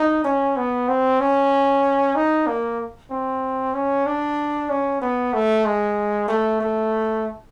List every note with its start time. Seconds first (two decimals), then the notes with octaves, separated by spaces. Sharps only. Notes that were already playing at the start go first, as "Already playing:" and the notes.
Already playing: D#4
0.24 C#4
0.57 B3
0.88 C4
1.20 C#4
2.16 D#4
2.47 A#3
3.11 C4
3.74 C#4
4.06 D4
4.70 C#4
5.02 B3
5.34 A3
5.65 G#3
6.28 A3
6.61 A3